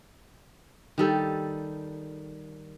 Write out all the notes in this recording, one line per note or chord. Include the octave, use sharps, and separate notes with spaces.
D#3 G3 A4